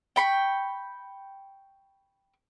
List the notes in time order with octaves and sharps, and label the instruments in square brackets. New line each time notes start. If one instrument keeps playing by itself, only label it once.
[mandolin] G5 B5 C#6